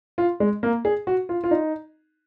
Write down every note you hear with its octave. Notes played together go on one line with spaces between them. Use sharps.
F4
G#3
A#3
G#4
F#4
F4
F4
D#4